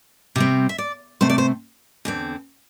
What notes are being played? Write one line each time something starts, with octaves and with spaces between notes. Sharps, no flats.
C3 G3 C4
E5
D5
C3 A3 C4 C5
D5
C5
E2 D3 C4